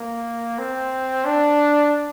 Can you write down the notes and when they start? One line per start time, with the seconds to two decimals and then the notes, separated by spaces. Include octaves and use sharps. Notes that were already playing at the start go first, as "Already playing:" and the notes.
Already playing: A#3
0.58 C4
1.25 D4